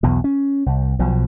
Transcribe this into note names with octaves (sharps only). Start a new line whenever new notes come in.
B1 E2 B2
C#4
C2
B1 B2 F3